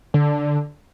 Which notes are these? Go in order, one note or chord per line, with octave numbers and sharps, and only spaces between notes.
D3